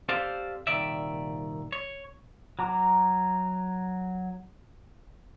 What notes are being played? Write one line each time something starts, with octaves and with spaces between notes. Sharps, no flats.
C4 G4 A4 C5 D5 F5
C2 G2 A#2 D#3 D5 E5
C#5
F#3 A#5 D6